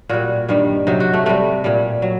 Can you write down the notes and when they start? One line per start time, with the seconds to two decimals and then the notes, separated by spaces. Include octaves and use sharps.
0.09 A#2 G3 F#4
0.48 G2 D#3 G3
0.87 C3 F#3 D#4
1.00 F#4
1.13 A3
1.26 C3 G3 A3
1.64 A#2 G3
2.02 F#3